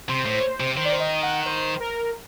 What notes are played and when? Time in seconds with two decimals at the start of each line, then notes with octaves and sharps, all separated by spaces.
0.09 C3 C5
0.26 A2
0.60 C3
0.77 D#3 C5
0.85 D5
0.92 C5
1.00 D#5
1.23 F#5
1.46 C5
1.80 A#4